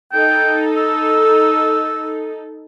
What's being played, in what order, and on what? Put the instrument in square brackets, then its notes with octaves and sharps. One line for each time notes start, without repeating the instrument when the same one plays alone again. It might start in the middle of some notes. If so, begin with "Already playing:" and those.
[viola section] D#4 A4 [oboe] G5
[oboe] E6